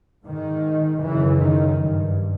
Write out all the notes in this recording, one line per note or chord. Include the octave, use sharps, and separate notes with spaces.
G#2 D#3
F#2 C#3 E3
D#3
G2